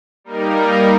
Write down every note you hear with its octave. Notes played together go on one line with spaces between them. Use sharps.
G3 A#3 D#4 A#4